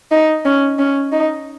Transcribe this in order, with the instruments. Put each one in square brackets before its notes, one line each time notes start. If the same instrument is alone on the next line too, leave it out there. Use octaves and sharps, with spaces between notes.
[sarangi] D#4
C#4
C#4
D#4